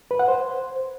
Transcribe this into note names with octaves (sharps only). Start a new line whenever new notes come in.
B4
F#5
C5